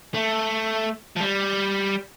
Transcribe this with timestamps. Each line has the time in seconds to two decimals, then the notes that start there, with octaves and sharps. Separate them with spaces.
0.14 A3
1.16 F3
1.20 G3